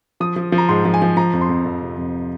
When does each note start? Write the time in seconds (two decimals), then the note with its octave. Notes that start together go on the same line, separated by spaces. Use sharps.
0.20 F3 D#6
0.36 F3
0.52 F3
0.58 A#5
0.69 G#2 C6
0.85 F3
0.94 G#5
1.02 F3
1.17 F3 A#5
1.33 F2
1.41 C6
1.49 F2
1.66 F2
1.82 C3
1.97 F2